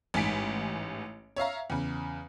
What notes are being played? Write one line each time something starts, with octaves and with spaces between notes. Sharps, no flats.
A1 G#2 G#5 B6 D7
C#5 E5 F5 A#5
E2 C#3